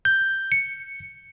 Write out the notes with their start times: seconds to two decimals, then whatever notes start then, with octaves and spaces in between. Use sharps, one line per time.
0.05 G6
0.52 C#7